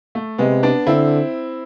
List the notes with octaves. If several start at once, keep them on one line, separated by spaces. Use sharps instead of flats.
A3
C3 G#3 B3
B3 D4
D3 C4 E4